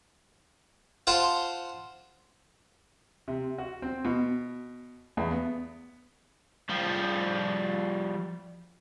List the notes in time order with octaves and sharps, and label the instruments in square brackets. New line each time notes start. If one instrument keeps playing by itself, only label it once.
[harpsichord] F4 C5 F#5 A5
[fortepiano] C3
F#4
C4
B2
E2
B3
[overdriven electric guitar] F3 G3